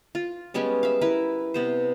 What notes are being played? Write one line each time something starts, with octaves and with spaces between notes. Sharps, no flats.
F4
G3 G#3 B3 C#4
E5 F5
E4 A#4 B4
C3 B3 C5